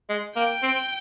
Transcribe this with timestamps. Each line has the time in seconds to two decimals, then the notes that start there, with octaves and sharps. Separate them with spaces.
0.09 G#3
0.35 A#3 G5
0.63 C4